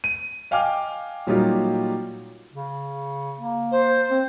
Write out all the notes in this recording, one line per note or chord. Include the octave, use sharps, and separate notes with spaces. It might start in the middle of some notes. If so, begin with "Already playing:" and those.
D#7
D#5 F5 G5 G#5 D6 F6
A#2 F#3 G3 D#4 F4 G4
C#3
A#3
C5
C4